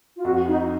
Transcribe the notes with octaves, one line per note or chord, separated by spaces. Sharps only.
F4
F2 F#4
D#4